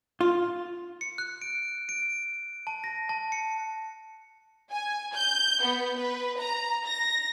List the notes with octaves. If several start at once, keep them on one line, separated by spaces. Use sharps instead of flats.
F4
C#7
F#6
D7
D7
A5
A#6
A5
C#7
G#5
G6
B3
B4
A#5
A#6